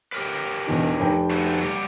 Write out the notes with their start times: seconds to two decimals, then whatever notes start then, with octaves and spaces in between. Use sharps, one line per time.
0.12 G4 A#4 B4
0.67 E1 E2 D#4
1.00 F1 G5
1.30 A3 F#4 C5
1.61 F#3 G3 G4